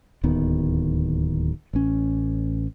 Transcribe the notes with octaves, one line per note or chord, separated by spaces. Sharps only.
D1 D#2 D#3 B3
A1 C#4